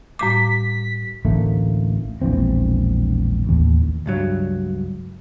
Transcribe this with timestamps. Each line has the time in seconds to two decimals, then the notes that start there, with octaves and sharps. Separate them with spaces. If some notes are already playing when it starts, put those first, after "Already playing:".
0.19 A2 G3 D6 B6
1.25 A1 D2 A3 A#3
2.22 E1 A#1 E3 C4
3.47 A1 D#2
4.06 C#2 G2 F#3